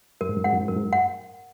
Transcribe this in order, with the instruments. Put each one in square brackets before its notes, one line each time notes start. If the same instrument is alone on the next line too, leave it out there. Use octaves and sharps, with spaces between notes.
[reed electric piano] F#2 [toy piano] A#4
[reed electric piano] G#2
F#2
[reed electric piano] G#2 [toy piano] F#5
[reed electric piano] F#2
G#2
[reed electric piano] F#2 [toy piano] A#4
[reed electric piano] G#2
F#2
[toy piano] F#5